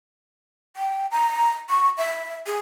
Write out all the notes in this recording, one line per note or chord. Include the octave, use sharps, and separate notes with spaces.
G5
A#5
C#6
E5
G#4